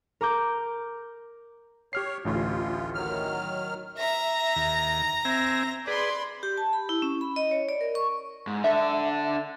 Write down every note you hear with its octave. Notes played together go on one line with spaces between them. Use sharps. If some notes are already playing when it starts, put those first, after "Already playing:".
A#4 A#5 D6 G6
G4 C#5 F6 C7
A1 D2 A2 F4
D#3 F#3 F6
E5 A#5
D#2
C4 E5 G#5 A#6
G#4 B4 D5 B5 C6
G4
A5
B5
E4
C#4
B5
D#5
C#5
D5
A#4
C#6
G#2
D4 A4 E5